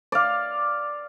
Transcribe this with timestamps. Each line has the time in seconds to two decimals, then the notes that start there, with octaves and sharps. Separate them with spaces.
0.12 D5 F5